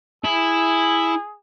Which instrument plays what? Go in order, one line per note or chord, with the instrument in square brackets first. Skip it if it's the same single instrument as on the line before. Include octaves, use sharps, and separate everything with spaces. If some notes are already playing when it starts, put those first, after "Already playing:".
[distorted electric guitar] E4 [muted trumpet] G#4